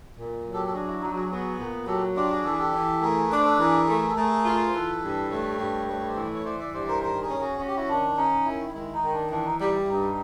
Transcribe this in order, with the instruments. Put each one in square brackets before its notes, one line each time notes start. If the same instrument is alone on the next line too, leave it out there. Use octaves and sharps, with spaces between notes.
[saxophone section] A#2
F#3
[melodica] G4 A4
A4
[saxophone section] D4 [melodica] F#4 G#4
[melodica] E4 F#4
[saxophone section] F#3 [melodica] D#4
[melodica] F#4 G#4
[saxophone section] B3 [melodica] F#4 G#4
[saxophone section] A#2
[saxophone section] F#3 [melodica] G4 A4
[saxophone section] D4 [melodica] F4 G4
[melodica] F#4 G#4
[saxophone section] E3 [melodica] A4
[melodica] G#4
G4 A4
[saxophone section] E3
[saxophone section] A3 [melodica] G#4 A#4
[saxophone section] D4 [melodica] B4
[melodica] C5
A4 B4
[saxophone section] E3 [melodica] G#4 A#4
[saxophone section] A3
[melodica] A4
[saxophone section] A3 [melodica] G#4 A#4
[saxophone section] F4
[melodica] C5
[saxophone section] E3 [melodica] A4 B4
[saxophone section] G2
[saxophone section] A3 [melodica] B4 C#5
[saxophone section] G2
[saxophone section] A3 [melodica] B4 C#5
[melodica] C5 D5
[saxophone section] E3
[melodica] C#5
[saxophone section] E3 [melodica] C5 D5
[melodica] D5 E5
[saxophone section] G2 [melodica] C5 D5
[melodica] A#4 C5
[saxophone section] D#3 [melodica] A#4 C5
[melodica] G#4 A#4
[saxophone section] C#4
[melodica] F#4 G#4
[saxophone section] C#4 [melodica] F#4
[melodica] G4
E4 F#4
[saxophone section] D#3 [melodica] D4
[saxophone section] C#4 [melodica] D#4
[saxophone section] D#3 [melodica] E4
[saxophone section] G#3 [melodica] E4
[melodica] D#4
[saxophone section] D#3
[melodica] D4
[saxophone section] E3 [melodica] D4
[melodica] D#4
[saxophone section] G3 [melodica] D#4
[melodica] E4
[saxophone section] G2 [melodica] D#4